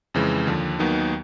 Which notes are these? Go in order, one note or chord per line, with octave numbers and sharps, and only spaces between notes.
F2 C#3 E3 G#3
D#2 D3 F3
D#2 D#3 F#3 B3 D#4